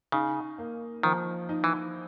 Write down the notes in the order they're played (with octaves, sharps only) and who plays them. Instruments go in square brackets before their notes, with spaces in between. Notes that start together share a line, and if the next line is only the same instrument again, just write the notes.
[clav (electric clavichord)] C#3 [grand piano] D#4
[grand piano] A#3
[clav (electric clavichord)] D#3 [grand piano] F3
[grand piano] D#4
[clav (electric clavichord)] E3